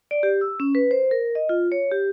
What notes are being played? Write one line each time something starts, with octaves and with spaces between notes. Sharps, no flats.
D5
G4
E6
C#4
B4
C5
A#4
D#5
F4
C#5
G4